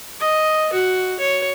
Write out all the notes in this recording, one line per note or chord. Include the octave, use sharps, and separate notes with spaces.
D#5
F#4
C#5